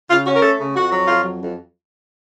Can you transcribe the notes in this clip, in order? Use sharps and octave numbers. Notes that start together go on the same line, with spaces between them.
C#3 F4
C#4 F#4
A#4
A3 A4
C#3
F2 F#4
F#3
F2 F4
F#3
F2